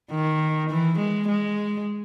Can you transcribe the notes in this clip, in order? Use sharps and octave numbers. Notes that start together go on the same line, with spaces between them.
D#3
E3
G#3
G#3